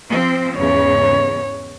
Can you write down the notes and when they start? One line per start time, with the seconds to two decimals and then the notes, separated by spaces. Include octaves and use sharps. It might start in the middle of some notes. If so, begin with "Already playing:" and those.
0.10 F3 C4
0.57 E2 G#2 C#3 C#5